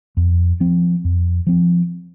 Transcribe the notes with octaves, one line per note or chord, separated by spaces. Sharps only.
F2
F3 C4
F2
F3 C4